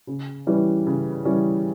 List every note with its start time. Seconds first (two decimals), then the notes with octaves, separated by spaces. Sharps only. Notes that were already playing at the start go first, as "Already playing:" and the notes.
0.07 C#3
0.47 E3 G3 C#4
0.87 C#3
1.25 E3 G3 C#4